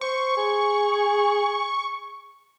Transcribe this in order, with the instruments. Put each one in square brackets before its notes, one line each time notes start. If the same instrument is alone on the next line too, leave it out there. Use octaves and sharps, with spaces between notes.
[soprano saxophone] C5 [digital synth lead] C#6
[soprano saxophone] G#4